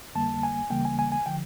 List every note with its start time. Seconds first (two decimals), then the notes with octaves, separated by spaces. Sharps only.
0.15 F2 D3 G3 A#3 A5
0.43 G#5
0.70 D2 C#3 E3 G3 A#3 G5
0.85 G#5
0.99 G#5
1.12 G#5
1.26 D3 F3 G5